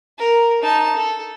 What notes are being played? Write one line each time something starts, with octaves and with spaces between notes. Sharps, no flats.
A#4
D#4 A5
A4